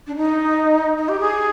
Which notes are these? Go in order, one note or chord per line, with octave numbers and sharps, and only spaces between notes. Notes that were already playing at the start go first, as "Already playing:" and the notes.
D4
D#4
D#4
G4
G#4